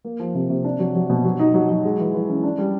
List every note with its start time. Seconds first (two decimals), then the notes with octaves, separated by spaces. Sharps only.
0.05 A#3
0.19 F3
0.35 C3
0.50 C3
0.64 D4
0.79 F#3
0.95 F#3
1.10 B2
1.24 F#3
1.39 D#4
1.54 F#3
1.69 F#3
1.85 G#3
1.99 E3
2.14 E3
2.29 C#4
2.43 D4
2.58 G3